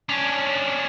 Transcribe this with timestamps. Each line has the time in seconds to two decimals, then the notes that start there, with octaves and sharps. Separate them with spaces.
0.09 C#4 D4